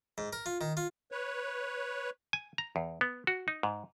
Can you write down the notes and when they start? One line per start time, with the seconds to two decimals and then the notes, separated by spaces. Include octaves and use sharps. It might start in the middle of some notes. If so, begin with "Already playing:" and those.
0.18 G#2
0.33 A#4
0.46 F4
0.61 D#3
0.77 F4
1.12 B4 C#5
2.33 G#5
2.58 A#5
2.76 E2
3.01 B3
3.27 F#4
3.48 D#4
3.63 G#2